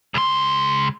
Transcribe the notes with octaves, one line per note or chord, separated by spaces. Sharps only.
C#2 C6